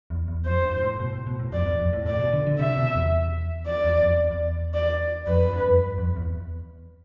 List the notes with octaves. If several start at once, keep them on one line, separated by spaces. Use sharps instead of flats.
E2
E2
F2 C5
G2
A2
B2
A2
B2
A2
F2 D5
E2
F2
A2
A2 D5
B2
D3
D3
C3 E5
B2
E2
D5
E2
F2
E2
E2
D5
F2 B4
G2
F2
G2
F2
E2